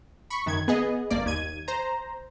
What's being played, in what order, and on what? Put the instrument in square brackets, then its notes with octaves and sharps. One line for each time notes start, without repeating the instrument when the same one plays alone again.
[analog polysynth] B5 C#6
F#2 D#3 G#6
B3 G#4 D#5
G1 A#3 D5
D#2 G#6 D#7
C5 A#5